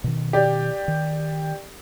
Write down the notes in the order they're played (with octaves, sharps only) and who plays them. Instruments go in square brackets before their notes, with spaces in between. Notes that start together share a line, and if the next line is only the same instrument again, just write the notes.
[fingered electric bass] B2 D#3
[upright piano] G4 D5
[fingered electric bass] D#3